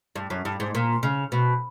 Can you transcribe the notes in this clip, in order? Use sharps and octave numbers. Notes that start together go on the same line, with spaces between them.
G2
F#2
G2
G#2
A#2
C#3
B2